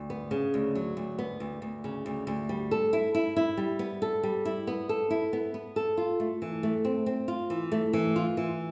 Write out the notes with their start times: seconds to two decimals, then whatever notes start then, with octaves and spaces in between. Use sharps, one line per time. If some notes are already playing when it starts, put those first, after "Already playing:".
Already playing: D2
0.10 B3
0.31 C#3
0.54 D2
0.75 F#3
0.97 D2
1.19 B3
1.40 D2
1.62 D2
1.84 C#3
2.06 D2
2.27 D2
2.49 G3
2.71 A4
2.93 E4
3.15 E4
3.36 E4
3.57 G3
3.79 B3
4.02 A4
4.23 G3
4.45 E4
4.67 B3
4.89 A4
5.10 E4
5.33 B3
5.54 B3
5.76 A4
5.97 F4
6.20 A3
6.42 E3
6.63 A3
6.85 C4
7.06 C4
7.28 F4
7.50 E3
7.72 A3
7.93 E3
8.16 F4
8.37 E3